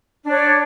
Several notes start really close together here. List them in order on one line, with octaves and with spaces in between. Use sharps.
D4 C#5 D5